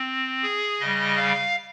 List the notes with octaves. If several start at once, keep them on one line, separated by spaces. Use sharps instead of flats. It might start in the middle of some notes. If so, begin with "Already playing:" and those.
Already playing: C4
G#4
C#3 G3 D#5
F5